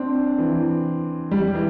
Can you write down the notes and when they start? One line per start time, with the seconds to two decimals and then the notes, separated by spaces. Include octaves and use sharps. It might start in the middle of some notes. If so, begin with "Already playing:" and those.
Already playing: C4 D4
0.38 E3
1.31 G3
1.55 E3